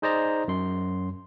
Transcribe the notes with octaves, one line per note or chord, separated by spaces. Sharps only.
D#4 G#4 C5 D5 D#5 A#5
F#2 C6